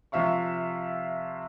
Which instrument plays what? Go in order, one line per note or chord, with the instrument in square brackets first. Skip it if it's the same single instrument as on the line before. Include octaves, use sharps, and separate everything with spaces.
[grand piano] C3 F3 E5 F5 C#6